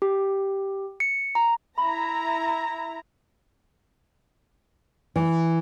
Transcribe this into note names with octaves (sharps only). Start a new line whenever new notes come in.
G4
C#7
A#5
E4 A#5 B5
E3